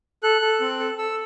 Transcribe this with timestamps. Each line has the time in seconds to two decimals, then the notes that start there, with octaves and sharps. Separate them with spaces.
0.23 A4 F#6
0.41 A4
0.61 C4
0.79 A4
0.98 A4 E6